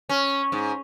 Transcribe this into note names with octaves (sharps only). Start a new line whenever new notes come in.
C#4
G#2